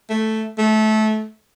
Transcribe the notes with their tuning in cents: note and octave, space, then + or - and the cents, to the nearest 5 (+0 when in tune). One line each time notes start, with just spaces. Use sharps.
A3 -5
A3 -25